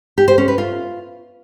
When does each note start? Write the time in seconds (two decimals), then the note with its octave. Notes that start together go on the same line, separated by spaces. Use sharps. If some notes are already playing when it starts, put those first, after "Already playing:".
0.18 G4
0.28 C5
0.38 C#4
0.48 B4
0.58 F4